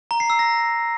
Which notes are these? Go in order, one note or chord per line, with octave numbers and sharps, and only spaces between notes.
A#5
C7
E6
A#6